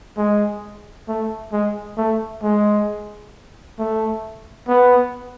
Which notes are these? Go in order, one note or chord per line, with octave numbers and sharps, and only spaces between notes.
G#3
A3
G#3
A3
G#3
A3
B3